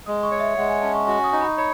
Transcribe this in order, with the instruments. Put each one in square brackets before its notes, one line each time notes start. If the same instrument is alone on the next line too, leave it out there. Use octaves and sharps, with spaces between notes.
[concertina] G#3 [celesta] D#6
[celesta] C#6
[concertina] C#5
[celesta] E5
[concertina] G#3 [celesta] F#5
[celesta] G#5
[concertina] C#4 [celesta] A5
[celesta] C#6
[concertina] F#4 [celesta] C#6
[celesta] D#6
[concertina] D#4
[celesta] B5
[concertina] C#5 [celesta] B5